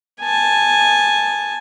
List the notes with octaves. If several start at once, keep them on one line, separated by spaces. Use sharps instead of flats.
G#5 A5